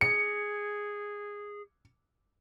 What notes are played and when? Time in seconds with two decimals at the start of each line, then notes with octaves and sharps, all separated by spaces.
0.01 G#4 C#7